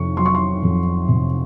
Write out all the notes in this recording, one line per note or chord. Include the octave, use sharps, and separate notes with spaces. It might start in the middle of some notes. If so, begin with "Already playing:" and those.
Already playing: F2 C3 C#6
F#3 C6
C#6
C6
F2
C3